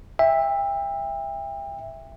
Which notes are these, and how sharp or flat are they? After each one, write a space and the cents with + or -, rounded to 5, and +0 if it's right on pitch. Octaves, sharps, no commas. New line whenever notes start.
E5 +0 G5 +35